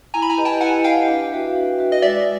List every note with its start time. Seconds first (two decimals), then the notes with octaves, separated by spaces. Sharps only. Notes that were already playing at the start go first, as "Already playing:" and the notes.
0.14 E4 G#5 A#5
0.22 B5
0.29 G#5 A#5
0.38 G4 B4 D#5
0.45 G5 A5
0.61 E4 F#5 G#5
0.84 G4 B4 D#5 F5 G5
1.08 D4
1.31 F#4 B4 E5
1.55 D4
1.78 F#4 B4 E5
1.92 D#5
2.02 G#3 D5 E5